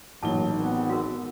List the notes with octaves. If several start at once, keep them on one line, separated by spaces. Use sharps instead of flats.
A1 A#2 F#3 D#4 A5 G7
G#1 B3
F#4 A#4